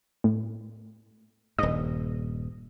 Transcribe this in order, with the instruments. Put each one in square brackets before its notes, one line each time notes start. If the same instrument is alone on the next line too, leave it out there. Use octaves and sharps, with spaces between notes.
[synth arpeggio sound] A2
[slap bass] D#1 G2 [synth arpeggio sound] D#5